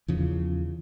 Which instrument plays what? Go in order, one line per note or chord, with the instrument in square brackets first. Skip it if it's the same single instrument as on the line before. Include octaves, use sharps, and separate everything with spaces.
[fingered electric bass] E2 C#3 F3